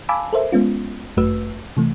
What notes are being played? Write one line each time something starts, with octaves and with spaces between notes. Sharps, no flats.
F5 G#5 A5 B5 D6 E6
A4 A#4 C5 E5
G#3 B3 C#4 F4
G1 F#2 A3 F#4 B4 E6
C3 E3 A3